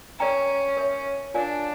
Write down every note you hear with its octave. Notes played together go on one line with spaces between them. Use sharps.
C#4 A#4 D5 G5 A#5
A#4 C#5 E5
D4 F4 A#4 D5 F5 G#5